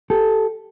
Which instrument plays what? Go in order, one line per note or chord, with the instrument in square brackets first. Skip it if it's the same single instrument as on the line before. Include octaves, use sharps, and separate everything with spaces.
[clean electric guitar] G4 A4